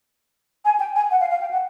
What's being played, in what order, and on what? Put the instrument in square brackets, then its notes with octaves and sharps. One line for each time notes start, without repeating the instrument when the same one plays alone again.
[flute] G#5
G5
G#5
F#5
F5
F5
G5
F#5